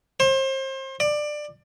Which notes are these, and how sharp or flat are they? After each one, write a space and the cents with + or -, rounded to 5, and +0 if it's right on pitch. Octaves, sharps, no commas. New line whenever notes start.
C5 +35
D5 +20